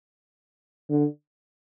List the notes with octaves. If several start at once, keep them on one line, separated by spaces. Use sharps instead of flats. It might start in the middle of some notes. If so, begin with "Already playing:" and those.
D3